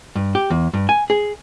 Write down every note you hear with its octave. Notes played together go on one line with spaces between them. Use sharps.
G2
G4
E2
G2
G#5
G#4